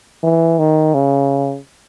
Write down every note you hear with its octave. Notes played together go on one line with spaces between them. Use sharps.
E3
D#3
C#3